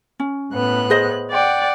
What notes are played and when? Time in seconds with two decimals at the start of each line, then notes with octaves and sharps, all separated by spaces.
0.20 C#4
0.52 A2 B3 F#6
0.90 G#4 C5 D#5
1.31 D5 F#5 G5